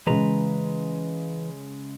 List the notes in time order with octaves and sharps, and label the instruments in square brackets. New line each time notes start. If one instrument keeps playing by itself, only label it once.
[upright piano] C#3 G#3 [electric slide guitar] E3 B4 A#5